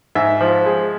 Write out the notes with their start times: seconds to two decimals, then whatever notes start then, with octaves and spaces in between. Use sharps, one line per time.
0.15 G#2 E5
0.41 F3
0.66 G#3